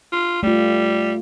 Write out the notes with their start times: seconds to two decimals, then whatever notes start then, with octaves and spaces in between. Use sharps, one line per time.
0.12 F4
0.43 G3 A3 F4